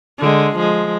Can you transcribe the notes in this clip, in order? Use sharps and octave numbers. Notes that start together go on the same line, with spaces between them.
D3 G#3
F3 G#3